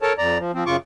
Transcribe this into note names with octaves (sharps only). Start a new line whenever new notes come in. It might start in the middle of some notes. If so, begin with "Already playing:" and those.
A4 A#4 C#5 A5
F2 D5 A#5
F3
F3 C4
F#2 C#3 F4 C#6 D6